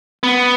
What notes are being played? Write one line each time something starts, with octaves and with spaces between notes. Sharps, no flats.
B3